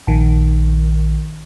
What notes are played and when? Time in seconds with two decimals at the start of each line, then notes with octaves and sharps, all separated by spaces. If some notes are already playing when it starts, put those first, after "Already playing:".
0.07 A#1 D#3